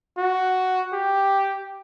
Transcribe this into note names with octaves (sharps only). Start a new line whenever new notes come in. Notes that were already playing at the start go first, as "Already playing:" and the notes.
F#4
G4